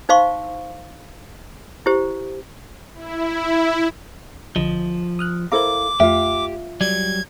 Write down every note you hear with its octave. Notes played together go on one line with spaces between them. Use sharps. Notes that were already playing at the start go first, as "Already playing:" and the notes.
D#4 C5 F5 C6 C#6
E4 G4 C5
E4
B1 D3 F3 D#5
D#6 F6 F#6
E4 A4 A#4 C5 F5 A#5 D6
F2 A3 F4 G4 E5
F#3 G3 D5 G#6